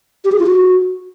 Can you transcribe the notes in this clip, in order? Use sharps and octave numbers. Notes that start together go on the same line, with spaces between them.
G4
G#4
F4
F#4